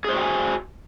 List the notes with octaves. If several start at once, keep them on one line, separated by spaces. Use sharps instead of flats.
F#4 G#4 C5 G5 G#5